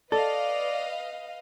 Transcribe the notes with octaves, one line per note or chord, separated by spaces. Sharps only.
A4 B4 D5 D#5 F5